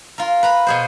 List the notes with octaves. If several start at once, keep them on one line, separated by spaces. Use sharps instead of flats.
F4 A#4
B4 A#5 B5
B2 G#4 C5